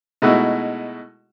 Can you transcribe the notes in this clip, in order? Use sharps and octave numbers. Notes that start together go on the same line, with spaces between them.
B2 G#3 A3 D#4 E4 F#4